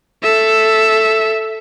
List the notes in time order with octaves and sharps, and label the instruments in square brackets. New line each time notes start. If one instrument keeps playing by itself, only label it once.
[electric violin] A4 E5